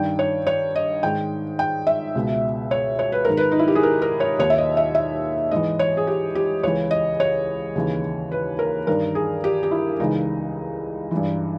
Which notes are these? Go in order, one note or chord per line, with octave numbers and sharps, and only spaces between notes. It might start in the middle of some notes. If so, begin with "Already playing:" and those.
Already playing: G2 D#3 G5
C#5
C#5
D#5
G#2 D#3 G5
G5
E5
C#2 B2
C#5
C#5
B4
G#2 D#3 A#4
B4
D#4
E4
G4
G#4
A#4
A#4
C#5
D#2 D#3 C#5
E5
D#5
E5
E5
G#2 E3 D#5
C#5
G#4
G4
G4
C#2 C#3 E3 C#5
D#5
C#5
D#2 C#3 E3
B4
A#4
G2 D#3 A#4
G#4
G4
G4
E4
C#2 C#3 E3 D#4
G2 E3